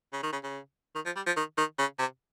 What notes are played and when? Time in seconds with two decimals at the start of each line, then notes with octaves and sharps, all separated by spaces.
0.13 C#3
0.23 D#3
0.32 C#3
0.43 C#3
0.95 D#3
1.05 F3
1.16 G3
1.26 F3
1.36 D#3
1.57 D#3
1.78 C#3
1.99 C3